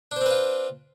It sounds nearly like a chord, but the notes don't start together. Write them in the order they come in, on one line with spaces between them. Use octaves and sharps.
D4 C5 C4 B4 F4